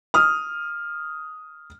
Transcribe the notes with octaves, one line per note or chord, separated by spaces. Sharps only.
D#6 F6